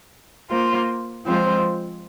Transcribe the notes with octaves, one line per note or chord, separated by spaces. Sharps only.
A#3 F4 C5
F3 G#3 C4 F4 C5